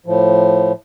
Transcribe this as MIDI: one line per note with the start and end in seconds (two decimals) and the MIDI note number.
0.06 0.72 45
0.06 0.72 53